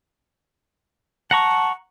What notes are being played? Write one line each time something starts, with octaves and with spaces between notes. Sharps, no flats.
F#5 A5 A#5 C#6